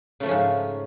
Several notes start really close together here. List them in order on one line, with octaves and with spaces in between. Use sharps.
C#3 A3 F3 C#4 G#2